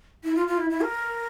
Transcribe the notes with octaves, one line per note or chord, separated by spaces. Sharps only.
E4
F4
F4
E4
E4
A#4